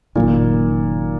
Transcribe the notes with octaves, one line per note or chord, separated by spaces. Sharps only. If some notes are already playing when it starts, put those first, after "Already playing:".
F#1 F#2 A#2 D#3